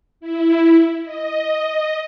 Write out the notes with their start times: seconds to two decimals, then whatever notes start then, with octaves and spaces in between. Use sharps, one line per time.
0.21 E4
1.04 D#5